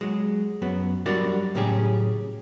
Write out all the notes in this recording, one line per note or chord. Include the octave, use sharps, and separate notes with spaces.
F#3 G#3
F#2 F#3 B3
F#3 G3 D4 F#4 A#4 D5
A2 C#3 F#3 C#4 G4 G#4